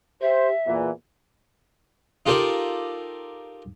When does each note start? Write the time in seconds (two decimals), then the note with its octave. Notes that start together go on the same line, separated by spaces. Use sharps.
0.22 G4 C5 E5
0.66 E2 A#2 E3
2.26 D#4 F4 G4 A4 A#4 D5